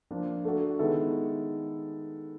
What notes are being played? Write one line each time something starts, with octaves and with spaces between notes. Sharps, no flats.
F3 A#3 D4
A3 D4 F#4 A4
D#3 G#3 B3 E4 A4